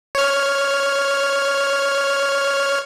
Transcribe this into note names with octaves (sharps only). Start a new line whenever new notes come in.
C#5 F6